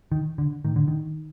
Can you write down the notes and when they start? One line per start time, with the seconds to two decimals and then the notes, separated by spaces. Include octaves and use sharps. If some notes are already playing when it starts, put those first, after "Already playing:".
0.12 D#3
0.38 D3
0.65 A2 D#3
0.76 D3
0.88 D#3